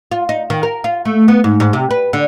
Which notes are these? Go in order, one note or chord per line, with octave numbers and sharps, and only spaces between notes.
F4
D#4
D#3
A#4
F4
A3
B3
G#2
G#2
C3
B4
D3